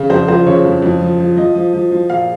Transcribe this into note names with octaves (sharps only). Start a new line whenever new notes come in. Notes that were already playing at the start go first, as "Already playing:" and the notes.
Already playing: C#3
F2 C5
F3 C5
C#3 C#5
F2
F2
F3
F3
F3 D#5
F3
F3
F3
A#2 F5